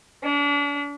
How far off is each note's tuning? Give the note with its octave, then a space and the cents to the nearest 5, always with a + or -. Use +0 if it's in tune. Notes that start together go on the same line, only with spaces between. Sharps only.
D4 -40